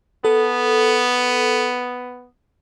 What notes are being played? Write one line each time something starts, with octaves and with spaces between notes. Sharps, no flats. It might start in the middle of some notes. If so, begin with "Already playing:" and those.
B3 A4